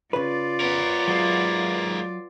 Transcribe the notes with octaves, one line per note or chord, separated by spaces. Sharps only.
C#3 F4 B4 D5
B3 A#4 C#5
F#3 G#3 A#3